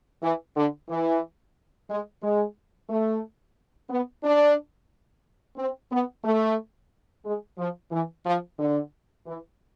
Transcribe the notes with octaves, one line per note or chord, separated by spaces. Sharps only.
E3
D3
E3
G#3
G#3
A3
B3
D4
C4
B3
A3
G#3
F3
E3
F3
D3
E3